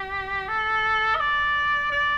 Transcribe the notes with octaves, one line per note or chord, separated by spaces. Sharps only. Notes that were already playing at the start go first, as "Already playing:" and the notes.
Already playing: G4
A4
E5
D5
D5